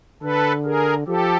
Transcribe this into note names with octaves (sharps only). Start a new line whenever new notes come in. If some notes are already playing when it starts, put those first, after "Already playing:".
D3 A4 B4
G#4 A#4
F3 G4 A4